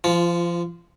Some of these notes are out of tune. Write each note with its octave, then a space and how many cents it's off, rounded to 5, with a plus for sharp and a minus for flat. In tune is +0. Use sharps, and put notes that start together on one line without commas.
F3 -25 F4 +0